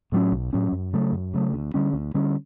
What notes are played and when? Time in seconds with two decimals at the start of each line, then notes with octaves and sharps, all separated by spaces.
0.12 A2 F#3 C#4
0.32 B1
0.53 A2 F#3 C#4
0.72 F#2
0.93 C#3 F#3 A3
1.12 F#2
1.34 C#3 F#3 A3
1.53 D2
1.74 D3 G3 C#4
1.93 D2
2.14 D3 G3 C#4